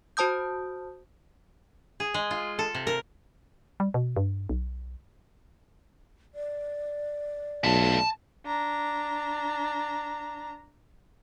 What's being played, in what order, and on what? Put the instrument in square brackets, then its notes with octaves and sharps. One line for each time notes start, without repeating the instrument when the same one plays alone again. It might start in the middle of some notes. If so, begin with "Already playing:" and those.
[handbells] F#4 C5 A5 D#6 G6
[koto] G#4
G#3
F4
A4
C3
A#4
[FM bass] G3
B2
G2
B1
[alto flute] D5
[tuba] B1 [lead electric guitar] A3 F4 [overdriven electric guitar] A5
[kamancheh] D4 A#5